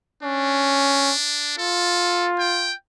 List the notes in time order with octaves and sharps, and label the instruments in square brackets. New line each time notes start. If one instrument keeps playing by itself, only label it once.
[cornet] C#4 [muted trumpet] D4
[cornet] F4 [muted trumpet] A4
[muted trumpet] G5